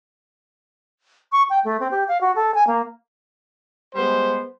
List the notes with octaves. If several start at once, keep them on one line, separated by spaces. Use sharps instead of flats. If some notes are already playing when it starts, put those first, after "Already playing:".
C#6
G5
A3
C4
G4
F5
F#4
A4
G#5
A#3
G3 G#3 B3 C5